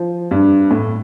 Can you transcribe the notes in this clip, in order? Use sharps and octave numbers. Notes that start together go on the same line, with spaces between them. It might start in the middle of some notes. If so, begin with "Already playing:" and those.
Already playing: F3
G2
A2